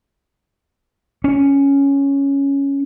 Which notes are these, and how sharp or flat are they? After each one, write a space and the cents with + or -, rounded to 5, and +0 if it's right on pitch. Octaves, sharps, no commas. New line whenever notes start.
C#4 +5